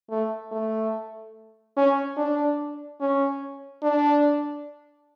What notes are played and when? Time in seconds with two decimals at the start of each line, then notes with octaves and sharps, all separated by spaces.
0.10 A3
0.52 A3
1.76 C#4
2.17 D4
3.01 C#4
3.83 D4